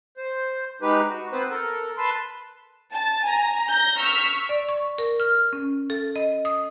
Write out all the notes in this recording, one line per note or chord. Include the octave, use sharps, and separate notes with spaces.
C5
G#3 D#4 G4 B4
F#4
B3 C4 B4 C5
A4 A#4
B4 A5 C6
A5
G#5 A#5
G6 A#6
C#6 E6 F6 B6
D5
C#6
A#4
F6
C#4
A4
D#5
D#6